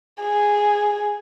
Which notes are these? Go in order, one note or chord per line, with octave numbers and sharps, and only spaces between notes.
G#4